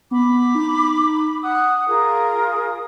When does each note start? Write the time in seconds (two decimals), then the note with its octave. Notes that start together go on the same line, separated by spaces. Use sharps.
0.11 B3 B5 D6
0.55 D#4
1.43 F#5 D#6
1.87 F4 G#4 A#4